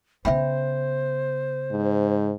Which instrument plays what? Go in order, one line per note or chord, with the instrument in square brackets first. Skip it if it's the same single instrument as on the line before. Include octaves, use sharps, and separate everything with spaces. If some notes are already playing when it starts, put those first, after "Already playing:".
[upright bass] C#3 B3 [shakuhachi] C5 [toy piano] E5 G5 B5
[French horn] G#2